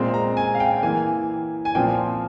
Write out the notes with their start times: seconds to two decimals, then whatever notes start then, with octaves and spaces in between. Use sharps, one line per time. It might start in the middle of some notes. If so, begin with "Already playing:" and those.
Already playing: A#2 G#3 C4
0.14 A#5
0.37 G#5
0.55 F5
0.60 G5
0.83 E3 A#3 G#5
1.65 G#5
1.75 A#2 F3 C4 G5